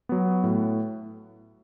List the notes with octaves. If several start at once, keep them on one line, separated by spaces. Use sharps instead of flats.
F#3 B3
A2